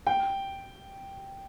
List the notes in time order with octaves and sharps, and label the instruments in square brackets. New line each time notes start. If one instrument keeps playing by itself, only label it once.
[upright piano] G5